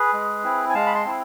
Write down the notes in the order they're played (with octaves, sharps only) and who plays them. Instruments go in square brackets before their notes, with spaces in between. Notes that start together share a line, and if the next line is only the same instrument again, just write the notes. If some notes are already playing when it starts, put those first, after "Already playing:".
Already playing: [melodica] G#4 B4
G#3
C4 E4
G#5
G#3 F5 A5
B5
A5 C6
C4 E4